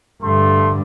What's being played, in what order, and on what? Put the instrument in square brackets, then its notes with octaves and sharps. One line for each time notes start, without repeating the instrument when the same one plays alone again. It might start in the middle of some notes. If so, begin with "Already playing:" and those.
[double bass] G2 D3 [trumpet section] A3 C6